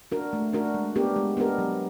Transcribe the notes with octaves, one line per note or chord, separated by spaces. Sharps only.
D4 F#4 A#4
A3
D4 F#4 A#4
G#3
B3 D4 G4 A#4
G#3
B3 D4 G4 A#4
F#3